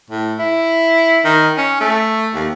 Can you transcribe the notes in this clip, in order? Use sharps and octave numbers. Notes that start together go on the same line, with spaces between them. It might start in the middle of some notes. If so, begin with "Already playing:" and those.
A2
E4
D#3
C#4
A3
D#2